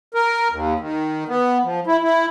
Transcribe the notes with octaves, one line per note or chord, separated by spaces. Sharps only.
A#4
D#2
D#3
B3
F3
E4
E4